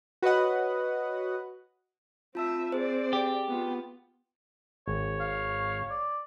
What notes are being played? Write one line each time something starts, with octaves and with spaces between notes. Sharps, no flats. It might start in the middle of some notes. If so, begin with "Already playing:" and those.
F#4 B4 C#5 D#5 F#5
C4 F4 E5 A5 E6
C4 G#4 C5 D5
G4 G#4
B3 F4
G#1 C#5
F5
D5